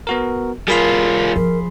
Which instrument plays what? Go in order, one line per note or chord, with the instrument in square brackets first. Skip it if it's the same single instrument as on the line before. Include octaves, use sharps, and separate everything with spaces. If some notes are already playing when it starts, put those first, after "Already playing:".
[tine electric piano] B3 F#4 A#4
[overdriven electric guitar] G3 F4 [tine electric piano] G#4 B5 C6 [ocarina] A#4
[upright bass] F3 [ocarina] A#4